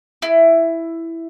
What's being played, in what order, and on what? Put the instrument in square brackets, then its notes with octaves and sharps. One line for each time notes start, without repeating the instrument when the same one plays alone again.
[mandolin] E4